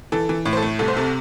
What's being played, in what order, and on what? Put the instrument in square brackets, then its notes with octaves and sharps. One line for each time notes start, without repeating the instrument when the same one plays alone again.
[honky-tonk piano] E3 A4
E3
A2
C5
A4
A3
C2 A4
C5
C3 A4